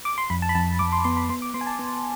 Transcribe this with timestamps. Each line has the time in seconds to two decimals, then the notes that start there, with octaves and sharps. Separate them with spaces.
0.05 D6
0.18 C6
0.30 F2 B5
0.42 A5
0.49 B5
0.55 F2 A5
0.79 F2 D6
0.92 C6
1.04 B3 C6
1.17 B5
1.29 B3 C6
1.42 D6
1.54 B3 C6
1.61 G#5
1.67 A5
1.79 B3